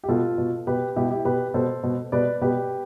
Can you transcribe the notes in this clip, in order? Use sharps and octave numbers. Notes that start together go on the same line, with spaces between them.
G4
B2 F4 A4
B2
B2 G4 B4
B2 E4 G4
E4 G4
B2 G4 B4
B2 A4 C5
B2
B2 B4 D5
B2 G4 B4